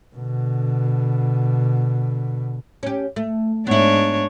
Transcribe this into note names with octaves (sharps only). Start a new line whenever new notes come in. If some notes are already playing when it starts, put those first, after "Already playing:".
B2 D3
C#4 G4
A3
G#2 B3 D4 E4 C#5